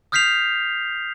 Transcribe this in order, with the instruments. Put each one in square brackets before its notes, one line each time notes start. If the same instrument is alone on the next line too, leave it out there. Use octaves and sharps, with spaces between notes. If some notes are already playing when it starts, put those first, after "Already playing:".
[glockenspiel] D#6 F6 G6 B6 C7 F7